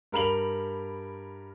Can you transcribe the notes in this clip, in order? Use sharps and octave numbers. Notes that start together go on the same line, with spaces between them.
G2 A#4 B5 F7 F#7